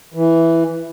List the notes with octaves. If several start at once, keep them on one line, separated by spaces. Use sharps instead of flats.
E3